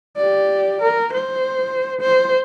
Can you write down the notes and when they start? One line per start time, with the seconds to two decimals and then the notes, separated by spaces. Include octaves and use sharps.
0.17 G4 D5
0.82 A#4
1.13 C5
2.01 C5